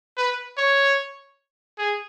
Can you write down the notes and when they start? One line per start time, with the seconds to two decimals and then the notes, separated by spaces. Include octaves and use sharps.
0.17 B4
0.58 C#5
1.78 G#4